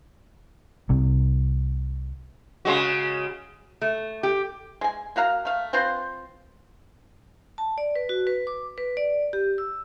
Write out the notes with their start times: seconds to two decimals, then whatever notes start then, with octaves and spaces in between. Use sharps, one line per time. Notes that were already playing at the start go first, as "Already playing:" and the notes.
0.90 C2 C3
2.65 C#3 G#3 F#4
3.82 A3
4.23 G4
4.81 G#3 G#5
5.16 A#3 F#4 F5 A#5
5.45 A3 F5
5.73 C4 F4 B4 C5
7.58 A5
7.78 D5
7.96 B4
8.09 F#4
8.27 B4
8.47 D6
8.78 B4
8.97 D5
9.33 G4
9.58 E6